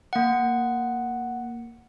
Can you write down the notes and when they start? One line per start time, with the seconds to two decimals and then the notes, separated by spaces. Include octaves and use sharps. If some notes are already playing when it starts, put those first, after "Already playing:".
0.13 A#3 F#5